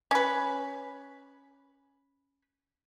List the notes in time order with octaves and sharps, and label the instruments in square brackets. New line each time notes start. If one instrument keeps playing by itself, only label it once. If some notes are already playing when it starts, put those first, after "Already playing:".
[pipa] C#4 B4